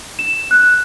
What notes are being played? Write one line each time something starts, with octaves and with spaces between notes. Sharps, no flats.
E7
F#6